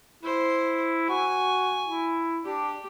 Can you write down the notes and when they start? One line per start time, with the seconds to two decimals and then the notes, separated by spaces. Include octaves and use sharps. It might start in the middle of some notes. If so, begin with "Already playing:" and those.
0.23 E4 C5
1.09 F#4 G#5
1.87 E4
2.45 D4 G4